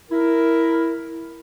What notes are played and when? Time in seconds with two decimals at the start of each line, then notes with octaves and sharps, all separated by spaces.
0.11 E4 A#4